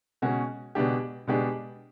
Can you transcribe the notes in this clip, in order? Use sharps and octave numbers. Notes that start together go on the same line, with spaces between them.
B2 G#3 C#4 F#4
B2 G#3 B3 D4 G4
B2 G#3 B3 D4 G4